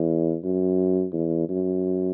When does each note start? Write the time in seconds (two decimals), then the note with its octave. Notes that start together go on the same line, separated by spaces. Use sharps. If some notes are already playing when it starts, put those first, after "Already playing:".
Already playing: E2
0.44 F#2
1.13 E2
1.49 F#2